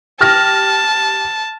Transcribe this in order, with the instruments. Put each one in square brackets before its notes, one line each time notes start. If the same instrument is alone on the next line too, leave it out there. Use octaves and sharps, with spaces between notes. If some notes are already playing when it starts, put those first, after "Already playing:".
[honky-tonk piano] G4 F6 A#6 [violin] A5